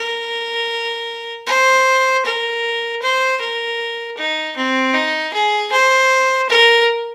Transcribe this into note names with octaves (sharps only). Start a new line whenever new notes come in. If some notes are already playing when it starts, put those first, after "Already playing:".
Already playing: A#4
C5
A#4
C5
A#4
D#4
C4
D#4
G#4
C5
A#4